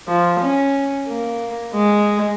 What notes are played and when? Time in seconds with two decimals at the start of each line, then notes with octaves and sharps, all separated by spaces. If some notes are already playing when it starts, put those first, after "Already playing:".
0.08 F3
0.41 C#4
1.08 A#3
1.74 G#3